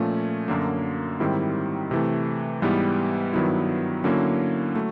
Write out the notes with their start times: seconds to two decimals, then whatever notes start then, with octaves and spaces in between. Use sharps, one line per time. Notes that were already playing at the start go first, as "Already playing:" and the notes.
Already playing: A#2 F3 A3 C#4
0.48 F#2 D3 F#3 A#3
1.20 G#2 D#3 G3 C4 E4
1.91 C3 E3 A3
2.62 G#2 E3 G3 B3
3.33 G2 D#3 F#3 B3 E4
4.04 D3 F#3 A#3 C#4 E4
4.75 F#3 A3